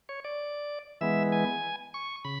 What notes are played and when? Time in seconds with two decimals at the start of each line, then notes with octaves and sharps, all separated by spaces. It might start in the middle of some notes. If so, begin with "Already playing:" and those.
0.09 C#5
0.25 D5
1.01 E3 G#3 B3 E5
1.32 G#5
1.94 C#6
2.25 C#3 B5